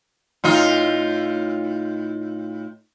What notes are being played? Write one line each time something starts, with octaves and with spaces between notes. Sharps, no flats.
A2 D#4 F4